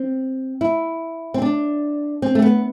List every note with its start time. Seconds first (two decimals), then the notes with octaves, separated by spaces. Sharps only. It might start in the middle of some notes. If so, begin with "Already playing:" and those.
Already playing: C4
0.61 E4
1.34 C4
1.42 D4
2.22 C4
2.35 A3
2.42 B3